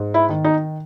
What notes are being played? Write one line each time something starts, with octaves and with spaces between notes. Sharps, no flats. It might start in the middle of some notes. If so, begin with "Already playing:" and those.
Already playing: G#2
E4
D#3
D#4